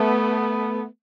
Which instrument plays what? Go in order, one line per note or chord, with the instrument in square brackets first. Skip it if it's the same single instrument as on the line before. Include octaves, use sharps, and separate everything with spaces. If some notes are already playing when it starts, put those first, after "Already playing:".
Already playing: [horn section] A3 B3